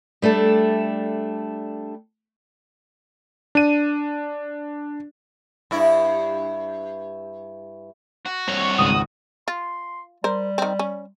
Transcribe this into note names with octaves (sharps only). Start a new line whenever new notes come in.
G3 A3 D4 A4
D4 D#7
G2 E4
F#4
C2 C#5
G#1 C#2 G#2 D#6
F4 C6
G3 A#4 C5
D#3 C4
C#4